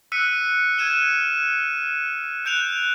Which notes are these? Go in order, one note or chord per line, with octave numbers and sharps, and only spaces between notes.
E6 F#6 B6 C#7 D#7
F6 G#6 D#7 E7 G7
F#6 G6 D7 F7